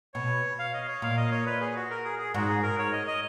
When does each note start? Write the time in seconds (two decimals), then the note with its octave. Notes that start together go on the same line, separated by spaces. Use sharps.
0.14 B2 C#5
0.59 F5
0.74 D#5
0.88 C#5
1.02 A#2 F5
1.17 D#5
1.31 C#5
1.46 B4
1.61 G#4
1.76 F#4
1.90 A#4
2.05 G#4
2.19 G#4
2.34 G#2 F#4
2.48 G#4
2.63 A#4
2.79 C#5
2.92 D#5
3.07 D#5